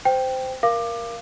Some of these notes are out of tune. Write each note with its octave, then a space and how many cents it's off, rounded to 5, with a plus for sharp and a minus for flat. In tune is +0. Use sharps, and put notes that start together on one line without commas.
C5 -15 G5 +0
A#4 +10 F5 -20 D6 +20